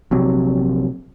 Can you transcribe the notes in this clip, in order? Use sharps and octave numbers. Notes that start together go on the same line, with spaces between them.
A#1 C3 F#3